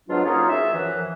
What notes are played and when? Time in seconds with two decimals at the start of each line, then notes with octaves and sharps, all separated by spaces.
0.09 G#2 B2 F#3 B3 D4 F4
0.24 F#3 A#3 C#4 D#4 F4 G#4
0.49 E5
0.74 F#2 E3 F3